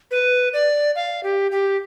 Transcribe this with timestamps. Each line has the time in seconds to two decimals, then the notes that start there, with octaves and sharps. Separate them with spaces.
0.11 B4
0.53 D5
0.96 F5
1.23 G4
1.52 G4